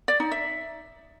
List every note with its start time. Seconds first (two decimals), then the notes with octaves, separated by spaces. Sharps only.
0.08 D5
0.20 D#4
0.31 E5